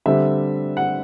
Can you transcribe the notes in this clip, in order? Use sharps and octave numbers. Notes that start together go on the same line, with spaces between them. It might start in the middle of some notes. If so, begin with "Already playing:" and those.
D3 G3 C4 E5
F#5